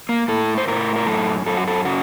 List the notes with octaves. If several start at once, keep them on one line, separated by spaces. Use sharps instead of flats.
A#3
A2 A4
C5
A2 A#4
A#4
F#2 A4
F#2 A4
F#4
A4
C#3 F#4